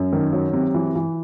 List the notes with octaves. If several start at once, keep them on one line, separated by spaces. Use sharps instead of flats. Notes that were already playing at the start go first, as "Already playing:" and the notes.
Already playing: F#2
D#3
F#3
C3
E3
E3